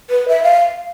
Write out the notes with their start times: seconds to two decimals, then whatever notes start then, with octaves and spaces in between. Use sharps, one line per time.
0.10 B4
0.28 E5
0.43 F5